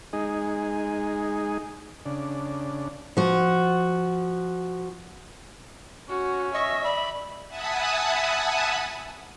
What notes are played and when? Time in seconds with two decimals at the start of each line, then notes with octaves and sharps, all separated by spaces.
0.13 G#3 D#4 G#4
2.05 C#3 D4
3.17 F3 F#4
6.09 C#4 F#4
6.54 D#5 E5 C#6
6.84 D5 B5
7.48 E5 F#5 G#5 A5 B5 D#6